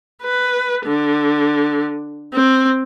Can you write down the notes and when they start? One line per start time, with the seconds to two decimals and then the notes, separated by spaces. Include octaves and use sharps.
0.23 B4
0.86 D3
2.34 C4